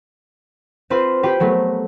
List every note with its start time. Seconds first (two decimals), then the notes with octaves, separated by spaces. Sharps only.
0.90 C4 F4 B4 C6
1.23 G4 B4 C5 G5
1.40 F#3 A3 B3 A#4